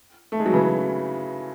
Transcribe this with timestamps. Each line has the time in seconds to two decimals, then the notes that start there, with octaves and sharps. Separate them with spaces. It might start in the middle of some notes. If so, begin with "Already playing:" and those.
0.32 A3
0.40 G#3
0.46 F#3
0.53 C#3 E3